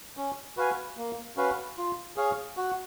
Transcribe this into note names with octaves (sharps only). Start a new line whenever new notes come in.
C#4
F#4 B4 F5 G#5
A#3
C#4 F#4 B4 F5
F4
G#4 C#5 F5
F#4